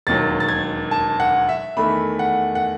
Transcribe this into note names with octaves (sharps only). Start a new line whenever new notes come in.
E1 D#2 D#3 F#3 A6
A6
G#6
A5
F#5
E5
E2 D#3 A3 B5
F#5
F#5